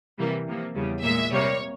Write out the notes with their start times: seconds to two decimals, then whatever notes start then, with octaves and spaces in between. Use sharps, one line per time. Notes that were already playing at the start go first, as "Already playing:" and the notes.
0.19 C3 E3 G3 A#3
0.47 C3 F3 A#3
0.75 E2 C#3 G3
1.03 A#2 G#3 E5
1.32 C3 G3 A#3 C#5